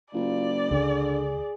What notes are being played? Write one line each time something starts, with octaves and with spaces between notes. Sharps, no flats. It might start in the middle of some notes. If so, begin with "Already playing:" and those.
F#1 F4 D5
C#2 D3 G#4